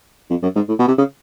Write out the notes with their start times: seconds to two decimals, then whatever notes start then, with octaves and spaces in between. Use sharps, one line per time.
0.30 F2
0.43 F#2
0.56 G#2
0.69 A2
0.79 B2
0.88 C3
0.98 C#3